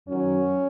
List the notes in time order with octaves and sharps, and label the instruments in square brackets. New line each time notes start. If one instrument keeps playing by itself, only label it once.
[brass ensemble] F#2 D#3 F#3 [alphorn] C#4